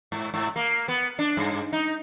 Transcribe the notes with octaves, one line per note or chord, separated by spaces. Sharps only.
G#2
G#2
A#3
B3
D4
G2
D#4